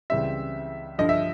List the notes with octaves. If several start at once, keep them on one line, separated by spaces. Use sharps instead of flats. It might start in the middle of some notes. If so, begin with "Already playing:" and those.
C#2 C#3 E3 G3 C4 E5
G2 D3 F3 D#5
E5